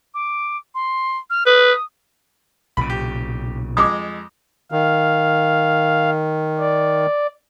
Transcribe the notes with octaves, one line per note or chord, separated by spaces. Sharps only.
D6
C6
F6
B4 D#6
B1 A#2 C#3 B5
G4
F2 G#3 D6 D#6
D#3 F5
D5